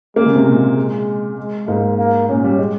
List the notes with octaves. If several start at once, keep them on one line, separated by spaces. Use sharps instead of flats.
G#3 A#3
C#3
C3
A#2
G#3
G#3
G#2 A#3
A#3
A#2 C#4
G3
G#3